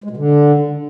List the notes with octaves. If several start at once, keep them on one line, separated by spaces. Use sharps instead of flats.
G#3
B2
D3